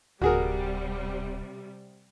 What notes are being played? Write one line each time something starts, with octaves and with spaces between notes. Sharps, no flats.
D1 C3 G3 F#4 G#4 A#4